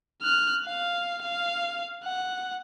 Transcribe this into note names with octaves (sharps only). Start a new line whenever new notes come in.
F6 F#6
F5
F5
F#5